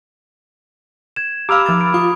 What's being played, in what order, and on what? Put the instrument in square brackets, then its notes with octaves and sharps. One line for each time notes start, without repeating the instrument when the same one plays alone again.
[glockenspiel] G#6 E7
[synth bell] G4 F5 [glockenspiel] A#5 B5 F7 [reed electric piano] D6 E6 F6
[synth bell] F3 A6
[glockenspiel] B5 D7
[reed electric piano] F4 [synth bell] D6 [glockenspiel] D#6